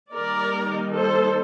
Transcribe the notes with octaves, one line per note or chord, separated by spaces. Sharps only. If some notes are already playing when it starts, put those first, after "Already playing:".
D#3 G3 A#3 D#4 A#4 D5
A4 C5